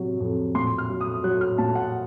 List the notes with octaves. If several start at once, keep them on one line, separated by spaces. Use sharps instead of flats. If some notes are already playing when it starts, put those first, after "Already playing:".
Already playing: C3 F#3
F2
A#2 C6
F6
F#3
D#6
F#3 F#6
F6
A#2 A5
F#5